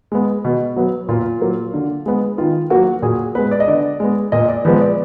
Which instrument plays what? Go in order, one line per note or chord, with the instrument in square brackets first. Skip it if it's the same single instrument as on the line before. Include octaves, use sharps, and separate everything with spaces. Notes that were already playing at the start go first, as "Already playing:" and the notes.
[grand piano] G#3 B3
B2
F#3 B3
A#2 F4
F#3 A#3
D3
G#3 B3
D#3 F4
F#3 A#3 F#4
A#2 G#4
G#3 B3 B4
D5
D#5
D3 D5
G#3 B3
A#2 D#5
D5
F3 G#3 B3 B4
D5